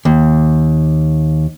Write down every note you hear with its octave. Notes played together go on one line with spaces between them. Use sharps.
D#2